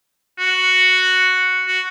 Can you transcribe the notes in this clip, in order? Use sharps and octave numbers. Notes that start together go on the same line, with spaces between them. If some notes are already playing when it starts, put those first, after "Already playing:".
F#4
F#4